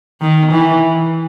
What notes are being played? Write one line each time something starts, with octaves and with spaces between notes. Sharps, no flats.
D#3
E3